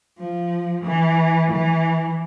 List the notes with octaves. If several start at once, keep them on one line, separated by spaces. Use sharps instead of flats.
F3
E3
E3